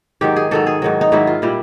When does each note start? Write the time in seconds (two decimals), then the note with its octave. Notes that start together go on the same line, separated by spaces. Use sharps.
0.21 G#2 D#3 F#3 G4
0.36 G#4
0.51 G#2 D#3 F#3 A4
0.67 G#4
0.82 G#2 D#3 F#3
1.01 D#4
1.12 G#2 D#3 F#3 E4
1.27 F4
1.42 A#2 G3 E4